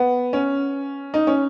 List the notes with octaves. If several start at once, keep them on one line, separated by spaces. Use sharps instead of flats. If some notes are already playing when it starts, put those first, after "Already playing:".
Already playing: B3
C#4
D#4
C#4